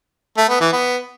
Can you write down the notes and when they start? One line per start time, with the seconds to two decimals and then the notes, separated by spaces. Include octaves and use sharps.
0.37 A3
0.49 B3
0.61 E3
0.72 B3